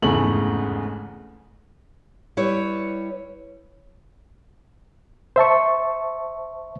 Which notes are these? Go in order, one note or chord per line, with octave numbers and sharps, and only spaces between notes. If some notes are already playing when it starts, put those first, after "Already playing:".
F1 E2 G#2 C#3 A3 F#7
G3 E4 B4 C#5
C5 E5 A5 C#6